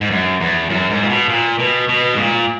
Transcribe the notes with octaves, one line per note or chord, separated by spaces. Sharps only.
G#2
F#2
E2
F#2
G#2
A#2
B2
A#2
B2
B2
G#2
A#2